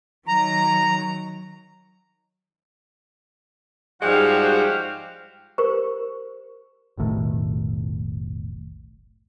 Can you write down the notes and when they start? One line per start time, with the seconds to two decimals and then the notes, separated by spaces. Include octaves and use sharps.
0.28 D#3 F#3 A#5
4.02 G#2 F3 G3 G#3 F#4 G4 C5 F5
5.58 G4 A#4 C5 C#6
6.97 F1 B1 A2 D#3